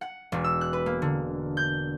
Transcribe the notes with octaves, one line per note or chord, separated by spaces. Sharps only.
F#5
E1
E6
F#6
B4
A#3
D3
G6